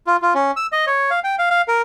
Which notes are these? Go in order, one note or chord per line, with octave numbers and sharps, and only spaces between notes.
F4
F4
C#4
E6
D#5
C#5
F5
G5
F5
F5
A#4